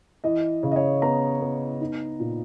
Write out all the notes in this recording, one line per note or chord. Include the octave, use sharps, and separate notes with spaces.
E3 D#5
C#3
D#5
C#5
B3 A#5
B3
D#4
A#2